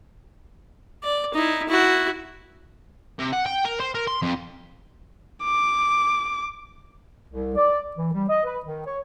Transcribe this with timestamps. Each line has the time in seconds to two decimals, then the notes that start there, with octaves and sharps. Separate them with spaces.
1.03 D5
1.34 D#4 E4
1.69 E4 F#4
3.19 C3
3.33 F#5
3.46 G5
3.65 A#4
3.80 C5
3.95 A#4
4.07 C6
4.22 F2
5.44 D6
7.28 C2
7.55 D5
7.95 E3
8.13 G3
8.27 D#5
8.43 B4
8.63 D#3
8.84 C#5